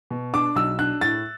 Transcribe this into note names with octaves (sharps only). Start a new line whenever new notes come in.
B2
D4 D6
B1 E6
D4 F#6
A2 A6